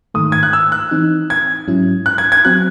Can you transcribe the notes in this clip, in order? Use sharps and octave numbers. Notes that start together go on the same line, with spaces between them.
G#2 D#3 A3 D#6
G#6
F#6
E6
F#6
E3 C4 D#4
G#6
G#2 F#3 C#4 E4
F#6
G#6
G#6
F#3 C4 F#4 F#6